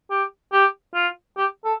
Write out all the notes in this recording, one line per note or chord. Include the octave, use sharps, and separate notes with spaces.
G4
G4
F4
G4
A4